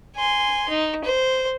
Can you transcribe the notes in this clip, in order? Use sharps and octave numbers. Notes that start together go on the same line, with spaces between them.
G#5 C6
D#4
C5